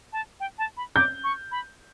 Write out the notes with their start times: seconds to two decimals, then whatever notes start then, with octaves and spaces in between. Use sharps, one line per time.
0.13 A5
0.40 G5
0.58 A5
0.77 B5
0.96 D6 G6
1.24 C#6
1.52 B5